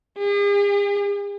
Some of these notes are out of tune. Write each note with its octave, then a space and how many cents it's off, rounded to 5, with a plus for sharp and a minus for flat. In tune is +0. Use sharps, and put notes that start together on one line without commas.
G#4 -45